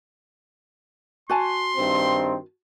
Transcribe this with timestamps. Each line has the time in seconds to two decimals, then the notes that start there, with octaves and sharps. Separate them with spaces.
1.30 F#4 G#5 A5 C6
1.77 G2 D#3 C4